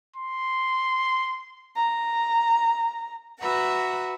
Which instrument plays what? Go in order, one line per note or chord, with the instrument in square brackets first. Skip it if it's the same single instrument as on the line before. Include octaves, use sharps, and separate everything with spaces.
[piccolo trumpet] C6
[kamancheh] A#5
[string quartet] F#4 B4 E5 F#5 A#5